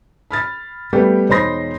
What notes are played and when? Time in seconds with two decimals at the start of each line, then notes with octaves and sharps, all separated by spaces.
0.31 B5 F6 A6
0.93 G3 A3 B3 G4 G5
1.29 E1 D#4 C5 B5 C6 A#6